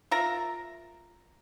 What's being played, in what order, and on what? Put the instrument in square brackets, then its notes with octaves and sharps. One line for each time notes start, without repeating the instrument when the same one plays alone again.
[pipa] F4 A#4 E5 A#5